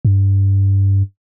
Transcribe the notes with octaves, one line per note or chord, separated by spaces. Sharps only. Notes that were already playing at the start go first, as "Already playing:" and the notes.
G2